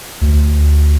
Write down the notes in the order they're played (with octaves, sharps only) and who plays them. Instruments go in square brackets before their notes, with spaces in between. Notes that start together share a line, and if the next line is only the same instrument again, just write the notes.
[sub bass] D2